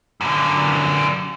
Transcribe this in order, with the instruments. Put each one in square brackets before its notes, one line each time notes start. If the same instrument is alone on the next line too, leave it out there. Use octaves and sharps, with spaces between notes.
[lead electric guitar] F#2 D3